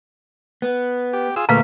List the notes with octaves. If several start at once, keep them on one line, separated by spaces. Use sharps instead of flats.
B3
G4
F4 G#4 E6
D2 A#2 A3 A#3 B4 F5 A#5